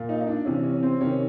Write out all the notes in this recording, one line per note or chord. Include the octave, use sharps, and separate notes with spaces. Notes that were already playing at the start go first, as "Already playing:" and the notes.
Already playing: A#2
D#4
D#4
D4
C3 E3 C#4
C#4
C4
C3 D#3 C#4